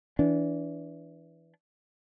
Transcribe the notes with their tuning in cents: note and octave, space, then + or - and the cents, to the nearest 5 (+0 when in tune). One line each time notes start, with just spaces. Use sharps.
E3 +0 D4 -25